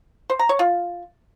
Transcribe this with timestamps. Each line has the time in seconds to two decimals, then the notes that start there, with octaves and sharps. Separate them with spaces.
0.30 C5
0.39 A#5
0.49 C#5
0.59 F4